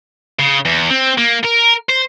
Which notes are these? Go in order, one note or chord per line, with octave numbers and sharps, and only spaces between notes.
C#3
E2
C4
A#3
A#4
C5